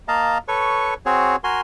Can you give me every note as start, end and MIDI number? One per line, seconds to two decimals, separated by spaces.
0.08 0.38 58
0.08 0.38 75
0.08 0.38 77
0.08 0.38 81
0.08 0.38 82
0.48 0.94 69
0.48 0.94 71
0.48 0.94 73
0.48 0.94 85
1.06 1.36 60
1.06 1.36 66
1.06 1.36 68
1.06 1.36 73
1.44 1.61 66
1.44 1.61 70
1.44 1.61 80
1.44 1.61 84